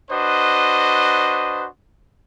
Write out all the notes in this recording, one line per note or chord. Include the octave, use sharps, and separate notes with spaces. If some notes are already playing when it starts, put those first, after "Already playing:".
D4 F#4 B4 C5 D#5